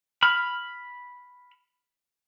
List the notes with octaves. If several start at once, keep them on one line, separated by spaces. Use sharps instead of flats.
B5 F6